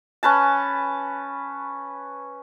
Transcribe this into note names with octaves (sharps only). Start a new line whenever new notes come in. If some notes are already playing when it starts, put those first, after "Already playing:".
C#4 B4 A5